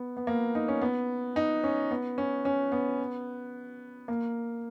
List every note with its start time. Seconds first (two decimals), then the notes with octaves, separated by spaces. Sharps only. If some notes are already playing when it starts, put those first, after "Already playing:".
Already playing: B3
0.17 B3
0.27 A#3
0.55 D#4
0.68 C#4
0.82 B3
1.36 D#4
1.64 C#4
1.91 B3
2.18 C#4
2.45 C#4
2.72 B3
4.08 A#3